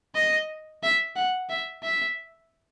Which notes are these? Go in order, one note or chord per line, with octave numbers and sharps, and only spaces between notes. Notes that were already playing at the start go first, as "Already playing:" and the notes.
D#5
E5
F#5
E5
E5